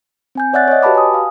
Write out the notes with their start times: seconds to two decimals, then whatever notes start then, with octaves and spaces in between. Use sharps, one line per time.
0.35 C4 G#5 G6
0.53 C#5 D5 E5 F#5 F#6 A6
0.68 C#5 D#5
0.83 F#4 G4 B4 A5 B5 D6
0.95 G#5 D#6
1.14 F5